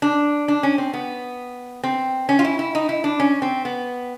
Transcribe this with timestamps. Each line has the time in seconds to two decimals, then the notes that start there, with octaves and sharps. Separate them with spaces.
0.02 D4
0.48 D4
0.63 C#4
0.78 C4
0.94 B3
1.83 C4
2.29 C#4
2.39 F4
2.44 E4
2.59 E4
2.75 D#4
2.89 E4
3.04 D4
3.20 C#4
3.42 C4
3.65 B3